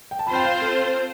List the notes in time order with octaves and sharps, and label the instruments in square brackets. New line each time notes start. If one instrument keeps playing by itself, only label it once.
[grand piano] G5
A5
[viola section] C4 F4 C5 [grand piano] B5
[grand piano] G5
F5
A4